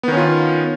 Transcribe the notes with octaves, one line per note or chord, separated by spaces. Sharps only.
D#3 B3 C#4 F4